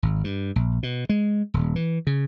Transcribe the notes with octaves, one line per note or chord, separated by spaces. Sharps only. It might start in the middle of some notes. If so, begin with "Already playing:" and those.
G#1
G2
A#1
B2
G#3
D#1
E3
C#3